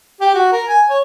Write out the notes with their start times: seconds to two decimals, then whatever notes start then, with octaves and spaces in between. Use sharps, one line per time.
0.21 G4
0.34 F#4
0.52 A#4
0.68 G#5
0.90 C#5